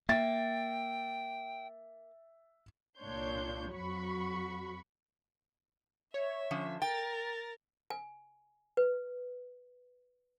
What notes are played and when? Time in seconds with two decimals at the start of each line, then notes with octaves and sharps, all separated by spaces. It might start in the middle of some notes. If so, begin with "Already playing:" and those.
0.09 A#3 E5 G5 A6
2.99 C2 A#2 D4 C#5 C6 G6
3.72 F2 F#3 F#4 B5 C#6
6.14 C#5 E5
6.51 D3 F3 C#4
6.82 A#4 G5 A6
7.90 G#5
8.77 B4